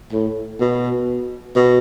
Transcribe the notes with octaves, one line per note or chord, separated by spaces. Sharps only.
A2
B2
B2